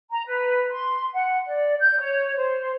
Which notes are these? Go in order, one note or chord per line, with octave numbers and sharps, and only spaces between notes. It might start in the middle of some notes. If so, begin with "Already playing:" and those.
A#5
B4
C6
F#5
D5
G6
C#5
C5